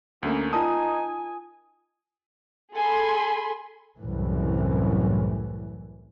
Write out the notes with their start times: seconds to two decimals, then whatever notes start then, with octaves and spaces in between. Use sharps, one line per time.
0.23 D2 A3 A#3 C#4
0.53 D#4 F4 A#4 G#5 A5 D#6
2.74 G#4 A4 G#5 B5 C6
3.98 C2 F#2 A2 E3